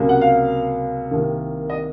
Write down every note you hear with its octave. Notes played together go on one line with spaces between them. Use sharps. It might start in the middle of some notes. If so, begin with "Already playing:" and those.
Already playing: C#2 C3 F#3 A#3
F#5
F5
C2 C3 D#3 A#3
D#5